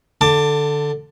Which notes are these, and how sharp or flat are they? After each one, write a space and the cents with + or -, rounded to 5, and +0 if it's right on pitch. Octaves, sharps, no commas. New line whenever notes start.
D3 +0 A5 +25 D6 +0